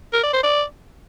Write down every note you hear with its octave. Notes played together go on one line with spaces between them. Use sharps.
A#4
D5
C5
D5